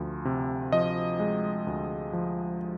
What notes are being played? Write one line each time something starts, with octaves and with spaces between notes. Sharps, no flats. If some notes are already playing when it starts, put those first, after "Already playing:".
Already playing: D2 F3
C3
F3 D#5
G#3
D2
F3